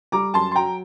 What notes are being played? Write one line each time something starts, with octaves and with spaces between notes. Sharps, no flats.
G3 A#5 D6
F#2 A5 C6
C6
F#3 G5 A#5